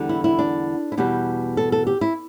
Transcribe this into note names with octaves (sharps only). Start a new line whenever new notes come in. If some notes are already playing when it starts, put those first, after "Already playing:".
Already playing: E2 D3 G3
E4
E4
D4
E4
E2 B2 G3 G4
A4
A4
G4
E4